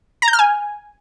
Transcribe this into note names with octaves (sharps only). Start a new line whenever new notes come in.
A#5
G6
F6
G#5